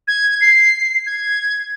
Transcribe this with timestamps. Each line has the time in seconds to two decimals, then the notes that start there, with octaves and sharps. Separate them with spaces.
0.08 G#6
0.41 C7
1.06 G#6